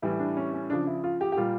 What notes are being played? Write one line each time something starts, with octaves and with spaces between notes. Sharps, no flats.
A2 E3 G3 E4
D4
C#4
C#4
C#3 F3 D4
E4
F4
G4
G4
A#2 G3 F4